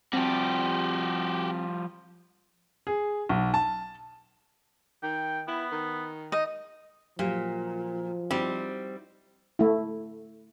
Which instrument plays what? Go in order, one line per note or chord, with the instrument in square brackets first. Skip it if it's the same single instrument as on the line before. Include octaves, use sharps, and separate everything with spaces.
[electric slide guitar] F3 G3 [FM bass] C4 [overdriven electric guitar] F#4 G4
[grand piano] G#4
B1
A5
[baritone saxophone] D#3 [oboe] G5
[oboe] B3 [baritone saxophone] E4
[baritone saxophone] D#3
[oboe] D#4 [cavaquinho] D#5
[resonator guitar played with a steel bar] A#2 [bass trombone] F3 [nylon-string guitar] F#3 G4
[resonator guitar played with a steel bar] G3 C4 [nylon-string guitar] D#4 E4 F#4
[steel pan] A3 E4